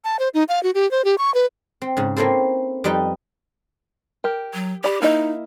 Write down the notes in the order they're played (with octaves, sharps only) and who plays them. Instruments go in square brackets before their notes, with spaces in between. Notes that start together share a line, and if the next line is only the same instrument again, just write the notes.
[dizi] A5
C5
D#4
F5
F#4
G4
C5
G4
C#6
B4
[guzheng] C4
G#2 C#3
A#3 C4 C#4 E4 A4 C5
F2 G3 D#4 B4 G5
[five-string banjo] G4 A#4
[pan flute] F#3
[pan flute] G4 [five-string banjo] D5 B5
[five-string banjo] A#3 E4 D#5 [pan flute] D#4